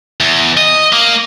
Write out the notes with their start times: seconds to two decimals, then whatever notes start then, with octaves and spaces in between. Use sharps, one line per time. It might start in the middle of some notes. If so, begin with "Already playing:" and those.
0.20 E2
0.57 D#5
0.93 A#3